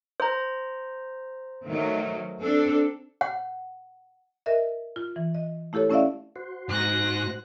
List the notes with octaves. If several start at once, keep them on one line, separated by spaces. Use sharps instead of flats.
C5 A#5
D#3 F#3 A3
C4 D4 A4
F#5
A#4 D#5 E5
F4
E3
D#5
A3 E4 G4 A4 C#5
A3 C#4 E4 D5 E5 F5
F#4 C5
G#2 F#6 A#6